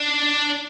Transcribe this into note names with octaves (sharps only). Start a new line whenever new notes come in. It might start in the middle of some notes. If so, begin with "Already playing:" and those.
Already playing: D4